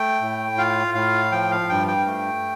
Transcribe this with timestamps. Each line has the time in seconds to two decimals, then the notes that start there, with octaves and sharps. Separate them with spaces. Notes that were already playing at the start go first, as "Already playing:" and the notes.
Already playing: A3 G5
0.21 A2
0.58 F4 F5
0.95 A2 F5
1.32 F3 G5
1.51 F5
1.69 G2 G5
1.87 G5
2.06 A3